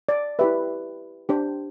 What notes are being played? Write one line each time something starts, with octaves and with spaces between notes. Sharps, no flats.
D5
E4 G4 B4 E5
D4 G4 C5